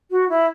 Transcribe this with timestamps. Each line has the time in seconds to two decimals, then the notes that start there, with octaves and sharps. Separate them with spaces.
0.10 F#4
0.29 E4